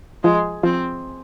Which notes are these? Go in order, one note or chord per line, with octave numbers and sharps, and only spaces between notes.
F3 G#3
F3 C4